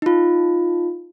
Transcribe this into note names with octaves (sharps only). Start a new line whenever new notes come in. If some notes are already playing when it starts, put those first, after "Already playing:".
D#4 F4